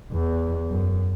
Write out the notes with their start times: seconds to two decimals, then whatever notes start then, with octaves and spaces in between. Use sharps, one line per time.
0.12 E2
0.70 F#2